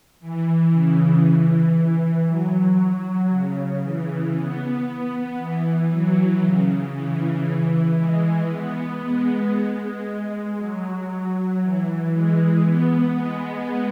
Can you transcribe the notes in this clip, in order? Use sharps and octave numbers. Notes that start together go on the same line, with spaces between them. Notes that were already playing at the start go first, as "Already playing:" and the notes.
E3
C#3
E3
E3
F#3
F#3
C#3
E3
B3
B3
E3
F#3
C#3
E3
G#3
B3
G#3
F#3
E3
G#3
B3
G#3